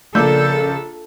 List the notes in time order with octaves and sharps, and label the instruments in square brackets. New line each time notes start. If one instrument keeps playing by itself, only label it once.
[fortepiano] A#1 A#3 [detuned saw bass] C#3 [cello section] A4 [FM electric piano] D5 E6 G6